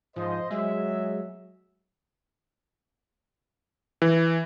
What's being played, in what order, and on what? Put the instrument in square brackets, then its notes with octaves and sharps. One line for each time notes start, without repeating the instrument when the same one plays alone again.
[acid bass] G#2 [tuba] F3 [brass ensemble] C5 D#5
[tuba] F#3 [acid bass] G#3 [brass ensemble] G#4 E5
[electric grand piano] E3